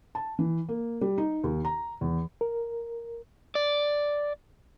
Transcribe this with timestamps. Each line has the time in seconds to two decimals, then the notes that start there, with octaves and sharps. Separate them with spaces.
0.15 A5
0.39 E3
0.69 A#3
1.01 G3
1.18 D#4
1.44 D#2
1.65 A#5
2.01 E2
2.41 A#4
3.55 D5